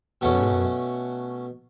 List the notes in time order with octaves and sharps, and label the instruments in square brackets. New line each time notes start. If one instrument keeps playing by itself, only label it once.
[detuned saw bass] E2 [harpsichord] B2 A3 C#4 F#4
[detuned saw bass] F#2
G#2
F#2